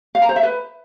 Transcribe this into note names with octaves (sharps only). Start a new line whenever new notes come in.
F5
A#5
C5
E5
B4